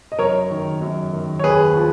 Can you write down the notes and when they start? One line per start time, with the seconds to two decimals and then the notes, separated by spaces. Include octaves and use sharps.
0.12 D#5
0.19 F#2 A#4 C#5
0.51 D#3
0.82 F#2
1.13 D#3
1.39 C#5
1.44 D#2 G#4 B4
1.76 F3